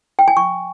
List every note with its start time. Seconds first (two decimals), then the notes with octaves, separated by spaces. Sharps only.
0.19 G5
0.28 G#5
0.37 C#6